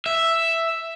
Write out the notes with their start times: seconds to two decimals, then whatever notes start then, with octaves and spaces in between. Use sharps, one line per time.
0.06 E5